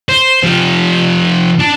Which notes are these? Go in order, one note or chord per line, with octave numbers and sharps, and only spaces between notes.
C5
F3 G4
D4